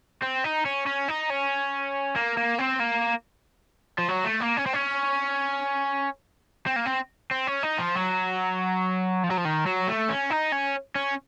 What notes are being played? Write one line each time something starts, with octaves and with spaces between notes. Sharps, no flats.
C4
D#4
C#4
C#4
D#4
C#4
A#3
A#3
C4
A#3
F3
F#3
A3
A#3
C#4
C4
C#4
C4
A#3
C4
C4
C#4
D#4
F3
F#3
F3
F#3
F3
D#3
F#3
A3
C#4
D#4
C#4
C#4